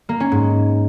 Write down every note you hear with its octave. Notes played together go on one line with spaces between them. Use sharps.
A#3
C#4
G#2